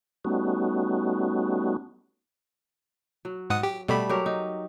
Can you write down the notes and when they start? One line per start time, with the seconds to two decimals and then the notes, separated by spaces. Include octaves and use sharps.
0.25 G3 A3 B3 C#4 D#4 F#4
3.25 F#3
3.50 G#2 F#5 D#6
3.63 G4
3.88 B2 G3 A3 B5
4.09 F#3 G4 A#4
4.26 D#4